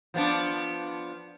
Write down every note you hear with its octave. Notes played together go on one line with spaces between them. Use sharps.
F3 B3 D4